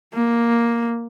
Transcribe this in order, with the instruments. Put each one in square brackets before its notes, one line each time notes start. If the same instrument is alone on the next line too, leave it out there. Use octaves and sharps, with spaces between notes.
[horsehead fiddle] A#3